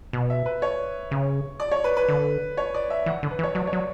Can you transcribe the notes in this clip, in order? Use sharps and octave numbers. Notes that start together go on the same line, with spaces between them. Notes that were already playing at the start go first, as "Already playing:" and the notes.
B2
E5
B4
C#5
C#3
D5
C#5
B4
B4
D3
C#5
D5
E5
E3 F#5
D3
B4
E3
C#5
F#3 D5
C#5
F#3